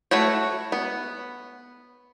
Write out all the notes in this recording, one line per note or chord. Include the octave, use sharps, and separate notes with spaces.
A3 E4 F#4 C#5
B3